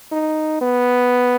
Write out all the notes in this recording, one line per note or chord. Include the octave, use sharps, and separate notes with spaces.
D#4
B3